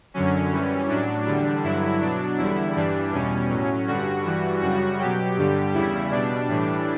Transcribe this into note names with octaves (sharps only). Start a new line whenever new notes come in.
F#2 D3 F#3 C#4
F#2 E3 G3
A2 F#3 D4
E2 D3 G3
G2 D3 F#3 E4
B2 F#3 D4
E2 D3 G3 E4
G2 E3 G3 D4
E2 B2 G3 C#4
A2 F#3
G2 D3 G3 F#4
G2 E3 G3
F#2 C#3 G3 F#4
B2 F#3 G4
G2 D3 G3
E2 C#3 G3 E4
B2 G3 D4
A2 E3 G3